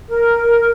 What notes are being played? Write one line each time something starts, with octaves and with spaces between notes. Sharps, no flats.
A#4